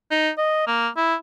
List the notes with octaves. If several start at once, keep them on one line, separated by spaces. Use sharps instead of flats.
D#4
D#5
A#3
E4